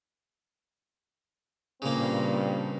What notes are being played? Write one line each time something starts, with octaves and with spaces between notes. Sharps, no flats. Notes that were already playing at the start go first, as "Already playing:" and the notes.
G2 A#2 C#3 A#3 C4